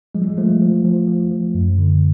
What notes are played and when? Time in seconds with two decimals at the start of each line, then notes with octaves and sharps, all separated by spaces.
0.15 F3 G#3
0.22 G3
0.30 G#3
0.37 F3 A3
0.62 F3
0.85 F3
1.08 F3
1.31 F3
1.55 F#2
1.79 D3